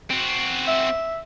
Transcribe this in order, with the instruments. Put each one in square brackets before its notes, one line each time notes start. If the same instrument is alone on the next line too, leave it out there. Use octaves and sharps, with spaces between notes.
[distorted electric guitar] C4 F#4
[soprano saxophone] E5